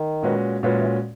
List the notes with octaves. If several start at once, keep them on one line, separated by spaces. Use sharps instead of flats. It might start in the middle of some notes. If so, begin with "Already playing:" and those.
Already playing: D#3
A#2 G#3 C#4 F#4 B4
A#2 G#3 C#4 F#4 B4
F#3
E3